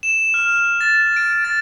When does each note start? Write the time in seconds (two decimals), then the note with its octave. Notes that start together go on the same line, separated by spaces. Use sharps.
0.03 E7
0.34 F6
0.48 F6
0.81 A6
1.16 D7
1.45 A6